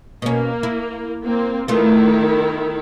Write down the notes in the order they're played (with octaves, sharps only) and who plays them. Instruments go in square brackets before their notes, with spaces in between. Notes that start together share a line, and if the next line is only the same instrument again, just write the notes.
[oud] B2 C#4 [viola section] A#3
[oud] E4
[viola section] A#3 C4
[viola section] D#3 E4 [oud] A3 B3 F4